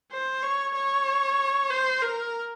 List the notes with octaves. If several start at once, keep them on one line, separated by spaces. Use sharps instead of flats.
C5
C#5
C#5
C5
A#4